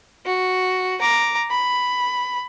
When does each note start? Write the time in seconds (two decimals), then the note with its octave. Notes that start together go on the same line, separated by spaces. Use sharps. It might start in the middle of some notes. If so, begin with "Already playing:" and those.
0.26 F#4
1.01 A#5 D6
1.50 B5